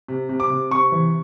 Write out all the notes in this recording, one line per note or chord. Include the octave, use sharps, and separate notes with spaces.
C3
C3
D6
C3
C3 C#6
E3